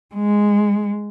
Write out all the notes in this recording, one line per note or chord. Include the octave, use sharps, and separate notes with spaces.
G#3